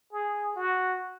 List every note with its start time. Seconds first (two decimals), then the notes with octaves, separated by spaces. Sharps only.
0.12 G#4
0.56 F#4